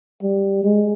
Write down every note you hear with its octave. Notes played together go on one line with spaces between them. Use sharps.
G3
G#3